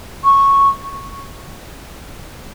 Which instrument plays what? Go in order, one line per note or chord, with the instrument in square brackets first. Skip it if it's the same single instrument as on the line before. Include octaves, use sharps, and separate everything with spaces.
[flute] C#6